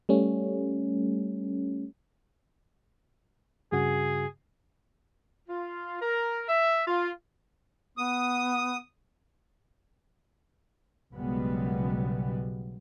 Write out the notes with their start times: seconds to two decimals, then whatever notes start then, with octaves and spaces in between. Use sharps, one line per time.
0.09 G3 A3 C#4
3.72 G2 C#3 F#4 G#4
5.49 F4
6.02 A#4
6.48 E5
6.87 F4
7.98 B3 D#6
11.12 B1 F#2 C#3 G3 G#3 B3